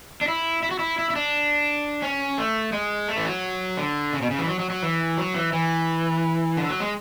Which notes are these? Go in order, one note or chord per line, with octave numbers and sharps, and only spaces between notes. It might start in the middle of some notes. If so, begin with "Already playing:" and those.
D4
E4
E4
F#4
E4
E4
E4
D4
C#4
A3
G#3
A3
E3
F#3
D3
C#3
B2
C#3
E3
F#3
F#3
F#3
E3
F#3
E3
E3
D3
F#3
G#3